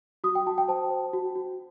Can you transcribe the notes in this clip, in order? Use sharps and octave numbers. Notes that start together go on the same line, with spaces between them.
F#4 D#6
G5
F#4 A5
G5
C5 A5
C5
F#4
F#4